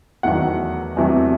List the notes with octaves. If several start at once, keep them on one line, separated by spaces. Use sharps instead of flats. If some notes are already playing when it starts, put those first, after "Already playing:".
E2 D#3 F#3 A3 F#5
E2 C3 F#3 A3